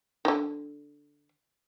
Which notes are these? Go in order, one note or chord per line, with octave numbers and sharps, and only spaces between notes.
D3 D#3